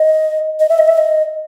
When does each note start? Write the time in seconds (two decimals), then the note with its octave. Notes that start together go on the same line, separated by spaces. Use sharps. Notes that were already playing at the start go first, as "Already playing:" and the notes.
Already playing: D#5
0.60 D#5
0.69 E5
0.78 D#5
0.88 E5
0.98 D#5